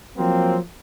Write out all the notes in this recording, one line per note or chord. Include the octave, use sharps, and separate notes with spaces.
F3 F#3 A#3 C4